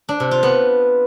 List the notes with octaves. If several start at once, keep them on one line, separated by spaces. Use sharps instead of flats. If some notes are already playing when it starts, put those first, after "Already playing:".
D4
C3
F4
B3